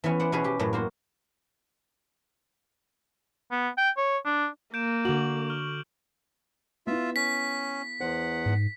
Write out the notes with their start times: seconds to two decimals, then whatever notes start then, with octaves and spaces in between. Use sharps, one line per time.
0.04 E3 B3 C#4
0.20 C5 D5 F#5
0.32 B2 C#4 F#4 G#4 B4
0.44 G4
0.59 F#2 A2 F#3
0.73 A#3 F#4 C5
3.51 B3
3.77 G5
3.97 C#5
4.25 D4
4.74 A#3 G6 D7 E7
5.05 D3 F#4 D6 F#7
5.49 C#6 F6
6.87 B3 E4 F4 E5
7.16 C#4 B6
8.00 E2 C5 F#5
8.46 G#2